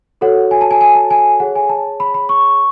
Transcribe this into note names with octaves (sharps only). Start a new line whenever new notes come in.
F#4 A4 C#5 F#5
G#5
A5
G#5
G#5
A5
G#5
G#4 C#5 F#5
G#5
A5
B5
B5
C#6